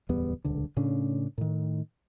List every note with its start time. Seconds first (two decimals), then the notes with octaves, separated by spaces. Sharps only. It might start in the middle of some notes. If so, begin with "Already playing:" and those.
0.09 D1 E2 G3 B3
0.45 D#1 C#2 D3
0.77 A2 C#3 C#4 D4
1.38 A2 D#3